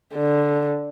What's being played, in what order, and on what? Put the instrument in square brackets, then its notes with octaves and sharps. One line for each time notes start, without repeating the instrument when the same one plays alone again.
[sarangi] D3